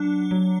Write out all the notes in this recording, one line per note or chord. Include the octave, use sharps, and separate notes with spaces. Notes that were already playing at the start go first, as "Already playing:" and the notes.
Already playing: F#3 D4
F#3